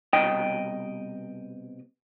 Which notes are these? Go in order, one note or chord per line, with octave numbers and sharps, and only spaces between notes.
C2 B2 D#5 G5